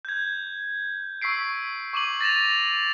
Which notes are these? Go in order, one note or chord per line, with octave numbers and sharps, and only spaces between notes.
G6 G#6
C#6 E6 B6 C7 D7
C#6 D6 D#7 F#7
A6 A#6 E7 F7